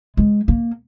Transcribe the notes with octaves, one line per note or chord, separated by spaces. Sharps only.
G#3
A#3